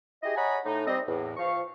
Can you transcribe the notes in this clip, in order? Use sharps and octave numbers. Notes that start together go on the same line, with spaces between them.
E4 G4 G#4 D#5
C#5 D#5 F#5 G#5 A#5 B5
A2 D#4
G3 C4 D#5
E2 A2
F3 F5 C#6